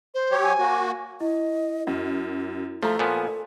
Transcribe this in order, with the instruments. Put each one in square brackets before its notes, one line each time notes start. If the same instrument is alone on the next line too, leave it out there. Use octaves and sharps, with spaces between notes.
[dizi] C5
[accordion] F#3 G4 C#5
[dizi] G#5
[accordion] A#3 F#4
[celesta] E4 [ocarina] D#5
[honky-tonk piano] F#2 [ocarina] F#4
[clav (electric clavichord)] F3 [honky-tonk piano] A3 A#5 [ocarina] A4
[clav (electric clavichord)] A#2 F3 B3 [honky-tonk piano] G#5